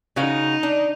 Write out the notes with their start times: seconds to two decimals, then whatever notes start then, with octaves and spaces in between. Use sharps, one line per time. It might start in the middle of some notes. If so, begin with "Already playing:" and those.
0.16 C#3 D#4 F#4 F5
0.63 D4